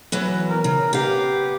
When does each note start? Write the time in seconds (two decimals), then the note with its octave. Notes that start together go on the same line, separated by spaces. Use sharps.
0.12 E3 F#3 B3
0.49 A#4
0.64 C#3
0.93 B3 G4 F5